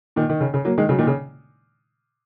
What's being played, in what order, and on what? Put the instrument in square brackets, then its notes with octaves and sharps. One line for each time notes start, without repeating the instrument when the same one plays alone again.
[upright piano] A#2 D#3
D#3
C#3
C#3
F#3 A#3
D#3 G#3
C#3 F#3
A#2 D#3
C#3